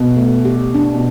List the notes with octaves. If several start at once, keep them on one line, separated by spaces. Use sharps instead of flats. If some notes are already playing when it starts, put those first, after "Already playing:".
Already playing: B2
A3
G4
D4
B2